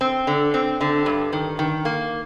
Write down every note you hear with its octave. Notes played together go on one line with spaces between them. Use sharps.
C4
D3
C4
D3
G2
D#3
D#3
A#3